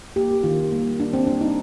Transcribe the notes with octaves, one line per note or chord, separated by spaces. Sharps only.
A#3 G4
D#3 F4
G3 A#3
D#3 D4
C4
G3 A#3 D4
D#4